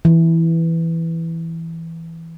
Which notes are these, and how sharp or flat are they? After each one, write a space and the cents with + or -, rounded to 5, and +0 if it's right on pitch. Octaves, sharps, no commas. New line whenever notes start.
E3 +0